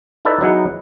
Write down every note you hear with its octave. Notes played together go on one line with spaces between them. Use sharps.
D#4 E4 A4 B4 D5
F#3 B3 D#4 E4 G#4 F#5